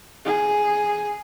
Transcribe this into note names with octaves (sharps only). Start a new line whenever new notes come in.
G#4